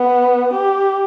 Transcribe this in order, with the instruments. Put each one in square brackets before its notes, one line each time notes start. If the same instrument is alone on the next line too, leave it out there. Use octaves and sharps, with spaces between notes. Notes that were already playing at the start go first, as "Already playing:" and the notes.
Already playing: [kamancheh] B3
G4